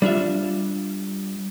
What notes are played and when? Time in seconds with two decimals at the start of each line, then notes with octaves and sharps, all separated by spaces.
0.02 G3 D4 F4 E5